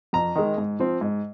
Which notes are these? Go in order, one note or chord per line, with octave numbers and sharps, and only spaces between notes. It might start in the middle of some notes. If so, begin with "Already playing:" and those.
F2 A#5
D#3 G#3
G#2
F3 C4
G#2